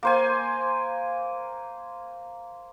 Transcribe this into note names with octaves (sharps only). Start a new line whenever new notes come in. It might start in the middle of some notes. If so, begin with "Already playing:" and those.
A#3 C5 G#5